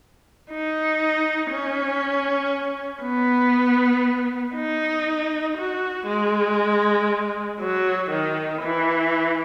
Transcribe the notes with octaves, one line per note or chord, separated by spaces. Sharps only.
D#4
C#4
B3
D#4
F#4
G#3
F#3
D#3
E3